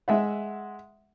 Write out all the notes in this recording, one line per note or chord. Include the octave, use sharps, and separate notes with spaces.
G#3 E5 F#5